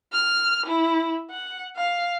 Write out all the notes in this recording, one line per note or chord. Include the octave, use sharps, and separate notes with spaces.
F6
E4
F#5
F5